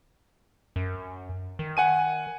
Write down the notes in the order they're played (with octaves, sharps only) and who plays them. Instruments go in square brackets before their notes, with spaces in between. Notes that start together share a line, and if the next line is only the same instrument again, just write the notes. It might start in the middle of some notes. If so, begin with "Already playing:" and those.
[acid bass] F#2
D#3
[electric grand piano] F#5 G#5 D#7